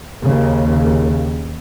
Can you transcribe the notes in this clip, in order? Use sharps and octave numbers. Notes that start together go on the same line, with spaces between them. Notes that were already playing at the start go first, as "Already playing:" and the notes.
D#2 C#3